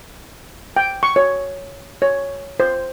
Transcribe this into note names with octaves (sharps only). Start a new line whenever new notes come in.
G5
C#6
C#5
C#5
C5